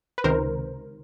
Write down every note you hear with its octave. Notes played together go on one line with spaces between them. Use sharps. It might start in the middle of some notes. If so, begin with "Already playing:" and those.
B4
C#2 C3 D#3 A#4 C5